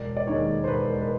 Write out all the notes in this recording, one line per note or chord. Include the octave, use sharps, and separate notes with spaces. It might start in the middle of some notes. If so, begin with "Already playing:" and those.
Already playing: E1 D5
D5
D#2 D#3 G#3 C#5
C5
E1 B4
B4